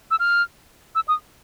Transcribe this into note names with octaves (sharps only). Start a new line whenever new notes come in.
E6
F6
E6
D#6